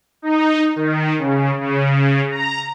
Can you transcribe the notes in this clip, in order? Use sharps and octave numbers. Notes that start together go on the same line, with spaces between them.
D#4
D#3
C#3
C#3
A#5